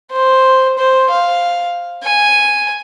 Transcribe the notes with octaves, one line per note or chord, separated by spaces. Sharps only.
C5
C5
F5
G#5